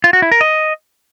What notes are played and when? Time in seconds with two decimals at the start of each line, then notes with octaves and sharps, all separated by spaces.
0.04 F4
0.13 F#4
0.22 E4
0.32 A#4
0.41 D#5